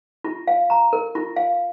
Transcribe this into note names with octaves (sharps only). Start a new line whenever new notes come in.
F4
F5
A#5
A#4
F4
F5